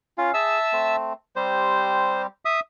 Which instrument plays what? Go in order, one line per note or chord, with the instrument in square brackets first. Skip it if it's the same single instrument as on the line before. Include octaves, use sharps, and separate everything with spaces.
[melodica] C#4 F5 [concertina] F4
[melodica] G#4 [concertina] E5 A5 E6
[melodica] A3 C4
[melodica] G3 C4 G4 [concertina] C5
[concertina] E5 D#6